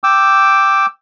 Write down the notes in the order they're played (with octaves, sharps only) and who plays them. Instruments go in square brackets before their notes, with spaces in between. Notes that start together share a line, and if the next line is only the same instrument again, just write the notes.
[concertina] G5 D6 E6